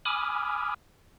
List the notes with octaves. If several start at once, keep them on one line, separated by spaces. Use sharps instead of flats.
G#5 B5 D6 D#6 F6